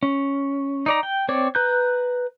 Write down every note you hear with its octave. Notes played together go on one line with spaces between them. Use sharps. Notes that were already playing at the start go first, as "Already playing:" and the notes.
C#4
D#4 D5 A#5
G5
C4 C#5 D5
B4 A#5 F#6 G6